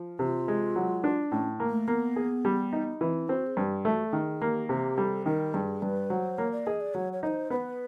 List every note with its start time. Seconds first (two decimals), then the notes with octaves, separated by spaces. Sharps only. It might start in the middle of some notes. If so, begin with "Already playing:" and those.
Already playing: F3
0.19 C3 F4
0.48 G#3
0.76 F#3
1.04 D4
1.32 A2 C#4
1.60 A#3
1.69 A3
1.88 A#3 B3
2.16 G#4
2.45 G3
2.73 D#4
3.01 E3 C4
3.29 C4 F#4
3.47 G#4
3.57 G2 G4 G#4
3.85 A3 G4
3.90 F#4
4.05 A4
4.13 D#3 G#4
4.42 A#3 G4
4.69 C3 G4
4.98 G3 A4
5.26 D#3 A#4
5.54 G2 G#4
5.82 G2 B4
6.10 F#3 C5
6.38 A#3 C#5
6.52 D5
6.66 G#4 D#5
6.81 D5
6.94 F#3 C#5
7.13 C#5
7.23 D#4 C#5
7.27 C5
7.50 B3 C5
7.56 B4